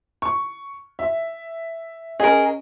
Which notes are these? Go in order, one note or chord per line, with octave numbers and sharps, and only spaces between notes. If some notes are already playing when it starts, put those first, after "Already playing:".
C#6
E5
C#4 G#4 A#4 D#5